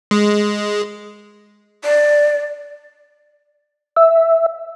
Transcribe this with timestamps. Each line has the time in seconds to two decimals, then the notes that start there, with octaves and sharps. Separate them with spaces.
0.11 G#3
1.84 D5
3.97 E5